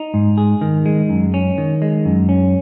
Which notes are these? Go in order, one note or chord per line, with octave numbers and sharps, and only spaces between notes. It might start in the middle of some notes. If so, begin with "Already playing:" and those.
Already playing: D#4
G#2
G#4
D#3
G#3
F#2
C#4
D#3
G#3
F#2
C#4